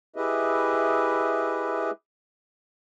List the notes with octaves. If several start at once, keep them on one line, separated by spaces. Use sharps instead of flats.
E4 G4 G#4 B4 D#5 E5